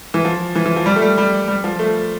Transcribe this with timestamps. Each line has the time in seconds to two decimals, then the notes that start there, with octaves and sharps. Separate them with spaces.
0.14 E3
0.25 F3
0.55 E3
0.65 E3
0.76 F3
0.86 G3
0.96 A3
1.02 G3
1.18 G3
1.48 G3
1.64 F3
1.79 A3